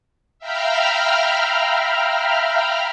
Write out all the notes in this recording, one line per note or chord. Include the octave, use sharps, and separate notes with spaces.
E5 F5 G5 A#5 B5 F6